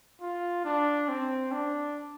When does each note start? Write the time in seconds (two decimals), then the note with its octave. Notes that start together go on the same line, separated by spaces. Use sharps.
0.21 F4
0.65 D4
1.09 C4
1.52 D4